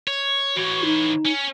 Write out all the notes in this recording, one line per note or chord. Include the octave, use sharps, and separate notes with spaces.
C#5
E3 F#4 C#5
D#4
C#4